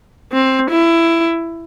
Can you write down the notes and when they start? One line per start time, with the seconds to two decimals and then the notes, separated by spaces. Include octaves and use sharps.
0.32 C4
0.71 E4